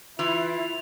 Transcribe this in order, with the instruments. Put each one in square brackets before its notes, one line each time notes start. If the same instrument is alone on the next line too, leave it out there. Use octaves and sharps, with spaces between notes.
[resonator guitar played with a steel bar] E3 [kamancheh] E4 [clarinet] F4 [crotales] F7